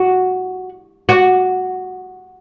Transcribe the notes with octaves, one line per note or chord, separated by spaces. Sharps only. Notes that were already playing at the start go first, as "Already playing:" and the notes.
Already playing: F#4
F#4